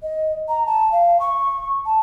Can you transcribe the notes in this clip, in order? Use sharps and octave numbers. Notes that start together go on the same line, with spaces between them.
D#5
A#5
A5
F5
C#6
A5